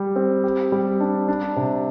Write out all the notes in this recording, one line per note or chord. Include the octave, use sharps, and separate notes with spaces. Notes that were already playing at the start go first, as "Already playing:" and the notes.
Already playing: G3 G4
C4
G4
G3
D4
D4
C3